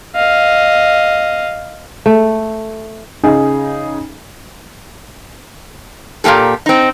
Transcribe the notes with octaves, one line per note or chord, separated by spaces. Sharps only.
D#5 F5
A3
C#3 D#4 G#4
A#2 C#3 A#3 G4 A4
C4 D#4